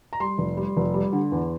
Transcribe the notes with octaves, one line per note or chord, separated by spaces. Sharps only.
A#5
G3 C6
F1
G3
F1
G3
D3
E2